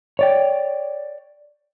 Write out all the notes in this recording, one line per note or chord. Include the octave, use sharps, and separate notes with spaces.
C#5 D5 G5